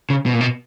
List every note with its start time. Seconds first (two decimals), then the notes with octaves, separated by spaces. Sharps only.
0.10 C#3
0.26 B2
0.34 A#2
0.41 B2